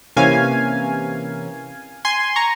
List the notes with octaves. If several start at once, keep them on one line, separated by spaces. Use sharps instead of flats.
C3 E3 A#3 C#4 F5 G#5
G#5 C6
A#5 C#6